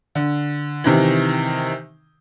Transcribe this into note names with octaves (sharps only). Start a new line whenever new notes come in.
D3
C3 D#3 E3